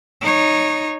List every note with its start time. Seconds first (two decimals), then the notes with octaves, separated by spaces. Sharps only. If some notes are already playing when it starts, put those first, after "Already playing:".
0.21 D#4 C#5